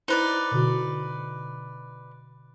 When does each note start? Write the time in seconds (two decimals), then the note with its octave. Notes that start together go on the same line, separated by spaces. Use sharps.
0.08 D#4 E4 B4 C5 D5
0.51 B2 D3 F#4